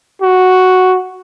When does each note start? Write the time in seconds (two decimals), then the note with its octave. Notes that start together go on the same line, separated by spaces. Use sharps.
0.22 F#4